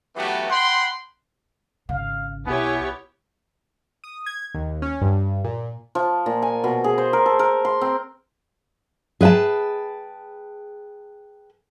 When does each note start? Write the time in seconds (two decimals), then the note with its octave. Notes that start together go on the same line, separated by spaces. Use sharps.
0.16 E3 F#3 A3 B3 F#4 G4
0.50 F#5 G5 B5 C6
1.89 G#1 C#3 F5
2.46 B1 B3 E4 G4 C#5 G#5
4.04 D#6
4.26 G#6
4.54 D#2
4.82 C#4
5.01 G2
5.44 A#2
5.95 F3
6.26 A#2
6.42 G#5
6.64 B2
6.84 G#4
6.98 C5
7.13 A#4
7.26 A4
7.39 A#4
7.65 C6
7.81 C4
9.21 G#4 B4 E5 G5 A5